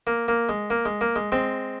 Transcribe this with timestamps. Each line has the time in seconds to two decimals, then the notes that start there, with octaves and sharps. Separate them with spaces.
0.07 A#3
0.28 A#3
0.49 G#3
0.70 A#3
0.86 G#3
1.01 A#3
1.16 G#3
1.32 G#3 C4